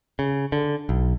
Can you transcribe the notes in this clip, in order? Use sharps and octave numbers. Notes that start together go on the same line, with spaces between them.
C#3
D3
B1